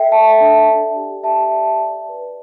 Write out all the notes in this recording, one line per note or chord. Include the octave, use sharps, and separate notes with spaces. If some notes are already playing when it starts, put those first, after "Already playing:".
Already playing: A4 D5 E5 G5
A4 E5 A5
D4
D5
G4
G4 E5 A5
D5
D5
B4